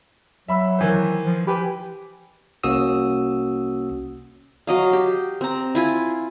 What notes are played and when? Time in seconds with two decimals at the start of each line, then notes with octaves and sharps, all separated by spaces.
0.48 F#3 E5 B5 E6
0.78 D#3 E3 C5
1.25 F3
1.47 G4 B4 G#5 B5
2.64 C2 A#3 C#4 F#4 D#6 E6
4.67 F#3 D#5 F5
4.93 G4
5.41 C4 A#5
5.75 E4 F4 G#5